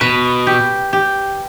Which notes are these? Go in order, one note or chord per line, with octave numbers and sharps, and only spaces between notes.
B2 B4
G4
G4